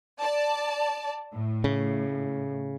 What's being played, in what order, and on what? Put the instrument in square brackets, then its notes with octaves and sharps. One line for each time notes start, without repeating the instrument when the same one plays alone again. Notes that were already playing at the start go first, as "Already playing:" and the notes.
[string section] D5 A5
A2
[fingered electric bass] C#3